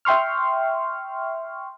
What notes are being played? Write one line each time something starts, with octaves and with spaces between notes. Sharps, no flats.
E5 G5 C6 C#6 F6